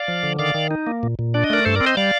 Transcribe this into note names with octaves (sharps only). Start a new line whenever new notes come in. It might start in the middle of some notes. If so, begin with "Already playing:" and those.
Already playing: D5 F5
F3
D3
D#3 D5 F5
D#3
D#4
A#3
A#2
A#2
D4 D5
D#5
A3 A#4 D5
G2 A4 C5
A#4 D5
C4
C5 D#5
G3 D5 F5